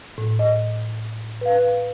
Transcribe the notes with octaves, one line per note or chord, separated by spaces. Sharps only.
A2
D#5
B4 F5